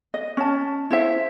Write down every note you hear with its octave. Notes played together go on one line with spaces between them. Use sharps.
D#5
C#4 A5
E4 C5 E5